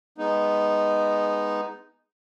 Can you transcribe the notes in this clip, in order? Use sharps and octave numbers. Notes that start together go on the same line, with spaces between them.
G#3 B3 D#4